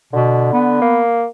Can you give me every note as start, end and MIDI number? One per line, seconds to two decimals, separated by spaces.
0.13 0.48 47
0.13 0.81 50
0.53 1.00 59
0.82 1.26 58